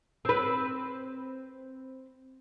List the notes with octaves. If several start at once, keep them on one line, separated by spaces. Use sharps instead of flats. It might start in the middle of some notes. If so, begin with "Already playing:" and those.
C4 B4